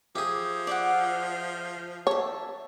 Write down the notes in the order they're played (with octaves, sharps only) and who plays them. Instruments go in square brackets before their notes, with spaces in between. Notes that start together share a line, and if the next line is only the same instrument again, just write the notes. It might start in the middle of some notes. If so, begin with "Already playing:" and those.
[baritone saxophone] F3 [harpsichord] G4 G#4 [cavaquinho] E5
[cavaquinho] D5 E5 F#5
[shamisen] C#5 [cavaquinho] E5 A5